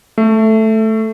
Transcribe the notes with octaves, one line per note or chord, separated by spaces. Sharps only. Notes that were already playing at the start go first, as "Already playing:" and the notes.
A3